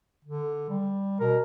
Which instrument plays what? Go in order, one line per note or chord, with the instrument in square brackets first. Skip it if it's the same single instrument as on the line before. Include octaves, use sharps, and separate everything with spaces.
[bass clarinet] D3
G3
[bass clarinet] B2 [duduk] A#4